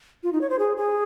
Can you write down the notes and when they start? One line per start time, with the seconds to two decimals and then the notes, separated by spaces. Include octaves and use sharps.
0.23 F4
0.33 D#4
0.41 C#5
0.50 C5
0.59 G#4
0.77 G#4